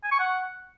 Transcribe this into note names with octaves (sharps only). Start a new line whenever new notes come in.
G#5
C#6
F#5